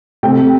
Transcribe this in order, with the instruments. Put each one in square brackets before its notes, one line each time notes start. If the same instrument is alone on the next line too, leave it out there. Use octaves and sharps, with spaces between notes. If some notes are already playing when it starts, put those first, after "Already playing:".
[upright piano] C3 A3 C4 G5